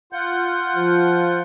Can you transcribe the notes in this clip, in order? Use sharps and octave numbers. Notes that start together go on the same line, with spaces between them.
F4 F#5 G6
F3